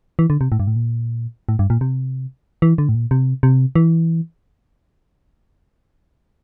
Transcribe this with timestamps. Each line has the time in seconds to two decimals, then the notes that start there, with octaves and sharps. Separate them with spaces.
0.19 E3
0.30 D3
0.41 C3
0.52 A2
0.60 G2
0.67 A2
0.76 A#2
1.49 A2
1.59 G2
1.70 A#2
1.81 C3
2.62 E3
2.78 D3
2.89 A2
2.95 A#2
3.11 C3
3.43 C3
3.76 E3